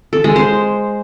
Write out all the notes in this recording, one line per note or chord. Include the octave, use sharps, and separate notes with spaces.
A4
G#3
C5